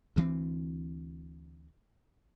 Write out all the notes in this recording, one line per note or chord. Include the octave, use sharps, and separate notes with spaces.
D2 E3 A#3 C4